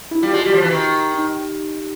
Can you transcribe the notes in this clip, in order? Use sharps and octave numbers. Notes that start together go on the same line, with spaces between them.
E4
G3 F4
G#3 F#4
G3 G4
F3
E3
D#3
D#4